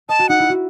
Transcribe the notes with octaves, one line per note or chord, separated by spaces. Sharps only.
D#5 A5
F#4
D#4 F#5
E4
F#4